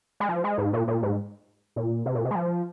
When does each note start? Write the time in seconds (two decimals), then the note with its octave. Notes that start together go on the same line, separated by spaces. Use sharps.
0.20 G#3
0.29 F3
0.44 G#3
0.58 G#2
0.73 A#2
0.88 A#2
1.03 G#2
1.76 A#2
2.06 C3
2.15 A#2
2.25 C3
2.31 G#3
2.35 F3